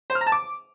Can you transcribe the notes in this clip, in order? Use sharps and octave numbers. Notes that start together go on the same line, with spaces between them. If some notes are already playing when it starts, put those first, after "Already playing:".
C5
F6
A#5
A5
D6